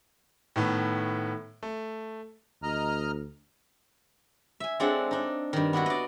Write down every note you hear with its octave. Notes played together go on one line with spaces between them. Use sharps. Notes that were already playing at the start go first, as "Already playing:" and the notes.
A2 D#3 A3 B3
A3
D2 D#5 A#5 F6
E5 G#5
G#3 C4 D4 A4 F#5
D4 D#4
G2 D#3
B3 D4 E4 F#4
D5 D#5